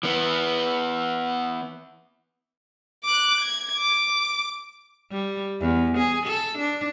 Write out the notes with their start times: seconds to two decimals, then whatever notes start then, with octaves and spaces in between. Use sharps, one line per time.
0.03 E3 B3
3.05 D6 F#6
3.41 G#6
3.78 D6
5.12 G3
5.60 E2
5.98 G#4
6.26 A4
6.58 D4